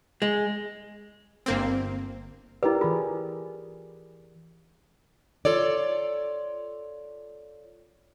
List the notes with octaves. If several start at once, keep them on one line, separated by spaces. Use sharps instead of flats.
G#3
G1 A#3 C4
E4 G4 A#4 B4 D5
E3 F4 G#4
F4 A4 C#5 D5